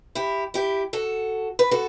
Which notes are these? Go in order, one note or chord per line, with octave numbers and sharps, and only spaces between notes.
E4 G4
E4 G4
F#4 A4
B4
F#4 A4